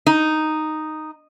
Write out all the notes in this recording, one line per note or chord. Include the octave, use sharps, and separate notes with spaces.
D#4